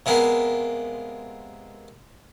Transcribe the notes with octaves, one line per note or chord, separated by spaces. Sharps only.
C3 G#3 A#3 B3